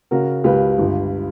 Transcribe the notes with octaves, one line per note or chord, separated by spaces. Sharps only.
C#3 F#4 A#4
C#2 G4 B4
G1